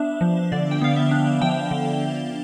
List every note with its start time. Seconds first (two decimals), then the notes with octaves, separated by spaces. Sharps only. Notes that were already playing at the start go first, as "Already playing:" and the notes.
Already playing: B3 D4 E5
0.21 F3
0.52 D3 D5
0.71 G5
0.81 B3 F5
0.96 E5
1.11 D4
1.41 F3 G5
1.71 D3